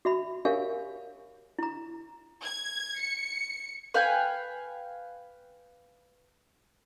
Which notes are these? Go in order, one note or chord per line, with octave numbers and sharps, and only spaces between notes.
F#4 E5 B5
G4 A#4 C#5 E5 F5 G#5
E4 A#5
G#6
C#7
B4 F5 G5 G#5